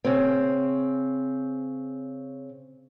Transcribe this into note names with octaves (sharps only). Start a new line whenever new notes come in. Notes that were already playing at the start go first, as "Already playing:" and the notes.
C#3 C4